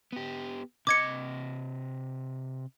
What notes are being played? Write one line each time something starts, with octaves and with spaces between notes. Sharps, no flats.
B3 G4
C3 D#5 D6 G#6 C#7